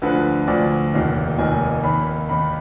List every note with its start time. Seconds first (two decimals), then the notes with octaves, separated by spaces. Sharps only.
0.02 D2 D3 F3 B4
0.47 D2 D3 F3 D5
0.93 F1 D#2 D#3
1.38 F1 D#2 D#3 G#5
1.84 D#2 D#3 B5
2.29 D#2 D#3 B5